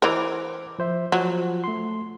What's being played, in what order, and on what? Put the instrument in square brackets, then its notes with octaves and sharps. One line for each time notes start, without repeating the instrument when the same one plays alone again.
[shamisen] E3 A#4 [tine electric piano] C5 D6
[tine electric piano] F3 C5 E5
[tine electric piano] F3 F4 [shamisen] F#3
[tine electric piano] A3 C6